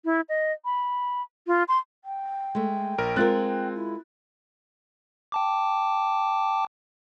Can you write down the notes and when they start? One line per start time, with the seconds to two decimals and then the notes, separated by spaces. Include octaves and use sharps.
0.05 E4
0.29 D#5
0.65 B5
1.47 F4
1.68 C6
2.05 G5
2.55 G#3 A3
2.98 A#1 A#4 D7
3.16 G#3 C4 F4 A#4 F#6 A6
3.75 E4
5.32 G5 A5 D6